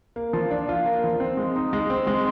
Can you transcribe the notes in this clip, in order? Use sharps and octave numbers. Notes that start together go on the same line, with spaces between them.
A#3
F3
D4
F4
A#3
F3
C4
G#3
D#4
G#3
C4
G#3